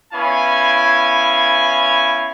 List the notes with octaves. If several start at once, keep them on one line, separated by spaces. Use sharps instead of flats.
B3 C#4 E4 F5 G#5